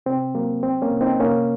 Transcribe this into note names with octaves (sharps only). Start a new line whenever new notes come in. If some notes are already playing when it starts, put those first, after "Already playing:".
C3 C4
F#3 A#3
C2 C4
A#3 C#4
C2
C4 D#4
C3 A#3 C#4